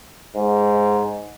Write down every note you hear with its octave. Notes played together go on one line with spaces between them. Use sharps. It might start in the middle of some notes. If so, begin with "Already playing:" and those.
G#2